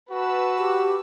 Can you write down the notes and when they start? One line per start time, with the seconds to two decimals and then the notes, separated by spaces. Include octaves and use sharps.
0.11 F#4 B4 A5 E6
0.58 G4